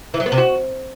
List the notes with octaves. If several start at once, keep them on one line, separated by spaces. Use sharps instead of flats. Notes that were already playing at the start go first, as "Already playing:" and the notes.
E3
F#3
B3
C3
F#4